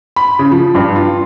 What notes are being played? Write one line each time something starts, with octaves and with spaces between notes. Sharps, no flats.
B5
C#3
F3
G2
F4